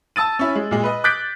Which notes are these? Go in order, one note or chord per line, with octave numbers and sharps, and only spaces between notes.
A5 E6 A6 D#7
C#4 E4
G#3
A#2 G#3
B4 D#5
D6 F#6 G6 A6 B6 D7